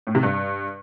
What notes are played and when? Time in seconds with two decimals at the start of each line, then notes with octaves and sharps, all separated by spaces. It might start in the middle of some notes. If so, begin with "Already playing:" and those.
0.07 A2
0.15 C3
0.23 G2